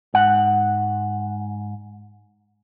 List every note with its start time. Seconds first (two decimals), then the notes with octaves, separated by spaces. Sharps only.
0.14 G#2 F#5